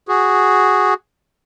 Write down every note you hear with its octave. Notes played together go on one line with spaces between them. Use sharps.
F#4 G#4